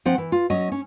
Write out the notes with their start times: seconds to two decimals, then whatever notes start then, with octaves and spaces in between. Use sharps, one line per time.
0.05 F3 C4 F#5
0.18 E3
0.32 F4
0.50 F#3 C#4 D#5
0.72 C#4